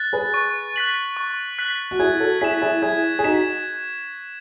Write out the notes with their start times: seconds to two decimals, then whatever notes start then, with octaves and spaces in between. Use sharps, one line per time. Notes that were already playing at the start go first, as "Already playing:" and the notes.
Already playing: F#6 A6
0.13 G#4 B4
0.34 C#6
0.76 F#6 B6 F#7
1.17 C#6
1.59 F#6 B6 F#7
1.91 F#4
1.99 E4 G#4 G#6
2.20 F#4 A4
2.41 E4 G#4 B6
2.44 E7
2.62 E4 G#4
2.82 E4 G#4 G#6
3.19 G#4
3.24 D#4 F#4 B6 E7